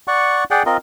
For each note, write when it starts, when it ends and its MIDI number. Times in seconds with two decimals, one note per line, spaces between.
0.08 0.44 74
0.08 0.44 78
0.08 0.44 85
0.51 0.63 68
0.51 0.63 74
0.51 0.63 78
0.51 0.63 79
0.66 0.77 60
0.66 0.77 65
0.66 0.77 70
0.66 0.77 75